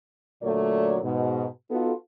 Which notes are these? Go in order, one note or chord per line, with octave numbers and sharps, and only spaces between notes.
A#2 D3 F#3 A3 C#5 D5
G#2 B2
B3 D#4 F4 F#4 A4